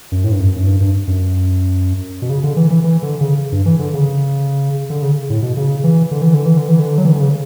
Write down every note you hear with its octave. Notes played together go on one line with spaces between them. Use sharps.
F#2
A2
G2
F#2
F#2
G2
G2
F#2
B2
C#3
D3
E3
E3
E3
D3
C#3
G2
E3
D3
C#3
D3
C#3
A2
B2
C#3
E3
D3
E3
D3
E3
D3
E3
D3
F#3
E3
D3
C#3